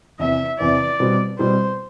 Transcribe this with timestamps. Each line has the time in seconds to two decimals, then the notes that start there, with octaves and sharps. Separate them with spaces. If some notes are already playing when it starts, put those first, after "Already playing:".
0.19 E2 C3 E3 E5
0.59 E2 C3 E3 D5
1.00 B2 G3 C4
1.39 B2 G3 C4 C5